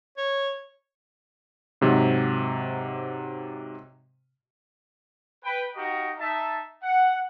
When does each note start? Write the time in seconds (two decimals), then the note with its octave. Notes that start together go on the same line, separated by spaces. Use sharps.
0.18 C#5
1.81 G#2 C3 F#3
5.44 B4 G5
5.75 D#4 F#4 G4 D#5 F5 A#5
6.19 D#4 E5 A5
6.83 F#5